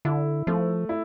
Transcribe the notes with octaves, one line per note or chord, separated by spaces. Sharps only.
D3 E4
F3 A3
E4